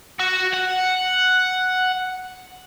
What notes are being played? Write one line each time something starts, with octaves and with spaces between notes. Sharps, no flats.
F#4
F#5